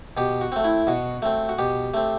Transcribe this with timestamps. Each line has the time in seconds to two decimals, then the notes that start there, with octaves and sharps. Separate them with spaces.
0.17 B2 G4
0.41 F#4
0.52 A3 C4
0.64 E4
0.87 B2 F#4
1.22 A3 C4
1.49 F#4
1.59 B2 G4
1.94 A3 C4